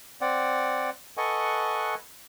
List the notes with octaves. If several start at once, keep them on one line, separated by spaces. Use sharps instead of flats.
C4 D5 F#5
A4 B4 D#5 F#5 G#5 C#6